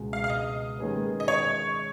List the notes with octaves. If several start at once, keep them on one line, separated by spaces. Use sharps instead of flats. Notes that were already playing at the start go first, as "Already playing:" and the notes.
Already playing: C#2 B2 G#3
F5
F5
D#5
D#3 G#3 C#4 G#4 B4
D#5
C#5